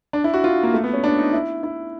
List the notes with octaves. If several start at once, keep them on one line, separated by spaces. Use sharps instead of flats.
D4
E4
F#4
F4
A#3
A3
B3
C#4
D4
D#4
E4
E4